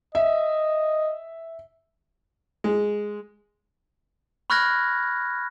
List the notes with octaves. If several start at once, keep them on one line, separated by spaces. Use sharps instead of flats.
D#5 E5
G#3
B5 C#6 F6 F#6 G#6 A#6